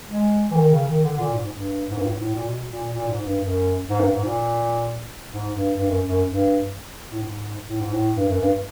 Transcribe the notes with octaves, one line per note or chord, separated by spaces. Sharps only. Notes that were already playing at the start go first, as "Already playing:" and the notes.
G#3
E3
D#3
C#3
D#3
D3
A#2
G#2
G2
G#2
G2
A2
G#2
A2
A#2
B2
A#2
A#2
G#2
G2
F#2
G#2
G2
G#2
A#2
G#2
G2
G2
F#2
F#2
G2
A2
G#2
A2
G#2
A2
G2
F#2
G2